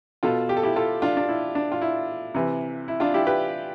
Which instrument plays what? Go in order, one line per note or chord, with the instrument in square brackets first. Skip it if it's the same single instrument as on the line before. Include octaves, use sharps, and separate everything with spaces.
[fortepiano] B2 F4 A4
G4
A4
E4 G4
F4 A4
D4 F4
D4
E4
D4
F4
E4
C3 E3
E4
D4 F4
E4 G4
G4 B4